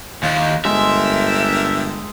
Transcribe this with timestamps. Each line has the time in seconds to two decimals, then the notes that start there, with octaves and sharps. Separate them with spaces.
0.23 D#2 G#3 E4 F4
0.65 G1 D3 G#3 A#4 E5 G5